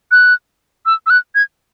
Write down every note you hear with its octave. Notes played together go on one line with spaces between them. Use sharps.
F#6
E6
E6
F#6
G#6